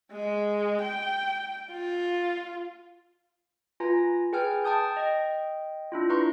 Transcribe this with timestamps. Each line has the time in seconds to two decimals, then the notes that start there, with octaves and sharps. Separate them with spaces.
0.11 G#3
0.82 G5
1.72 F4
3.80 F4 B4 G#5 A#5
4.33 G#4 B4 G5 G#5 F6
4.64 G5 A5 D#6 G6
4.97 D#5 G5
5.92 D4 E4 F4
6.09 D4 E4 B4 A#5 C6 C#6